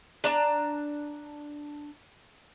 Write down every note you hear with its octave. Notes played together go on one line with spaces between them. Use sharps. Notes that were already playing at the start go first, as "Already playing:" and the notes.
D4 A5 A#5